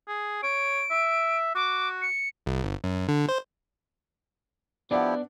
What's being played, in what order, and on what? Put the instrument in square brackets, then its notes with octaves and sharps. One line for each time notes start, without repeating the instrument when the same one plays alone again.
[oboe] G#4
[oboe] C#5 [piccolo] D7
[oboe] E5
[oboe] F#4 [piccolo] D6
[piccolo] C#7
[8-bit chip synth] C2
G1
F#2
D3
C5
[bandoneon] F3 E4 G4 [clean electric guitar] B3 D4 [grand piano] D5 F#5